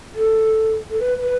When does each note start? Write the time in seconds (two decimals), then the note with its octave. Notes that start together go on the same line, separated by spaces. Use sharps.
0.15 A4
0.90 A4
0.99 B4
1.20 B4